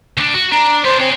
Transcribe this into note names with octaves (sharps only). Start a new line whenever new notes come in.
D2 D4
F#4
D4 A#5
B3 D4 C5
C4 G#4 C#5